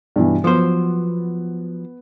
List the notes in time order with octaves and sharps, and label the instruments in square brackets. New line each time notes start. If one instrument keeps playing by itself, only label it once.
[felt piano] G2 B2 E3
[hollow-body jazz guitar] F3 F#3 C5 [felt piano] B3